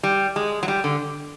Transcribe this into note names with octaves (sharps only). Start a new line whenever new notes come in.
G3
G#3
F#3
G3
D3